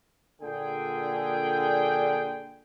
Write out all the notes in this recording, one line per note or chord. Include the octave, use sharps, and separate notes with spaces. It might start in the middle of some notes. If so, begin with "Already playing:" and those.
A#2 D3 G#4 G5